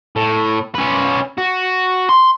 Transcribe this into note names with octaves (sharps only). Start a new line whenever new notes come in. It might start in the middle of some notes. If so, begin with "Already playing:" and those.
A2
C#4 B4
F#4
C6